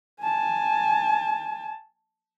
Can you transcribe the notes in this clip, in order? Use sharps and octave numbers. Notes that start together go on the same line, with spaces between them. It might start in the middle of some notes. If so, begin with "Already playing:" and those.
G#5 A5